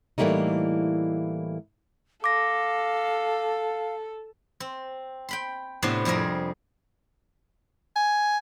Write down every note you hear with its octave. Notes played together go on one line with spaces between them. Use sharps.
A2 E3 G3 A3 A#3 D#4
A4 F5 D6 A#6
C4
G5 B5 C6
A2 C3 B3 D4 C5 C6
F2 G3 C4 G#4 A#4
G#5